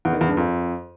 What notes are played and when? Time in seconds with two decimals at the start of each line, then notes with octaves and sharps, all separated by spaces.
0.05 E2
0.13 D#3
0.21 E2
0.29 G2
0.37 F2